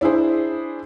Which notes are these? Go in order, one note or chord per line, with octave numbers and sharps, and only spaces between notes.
D4 E4 G#4 C5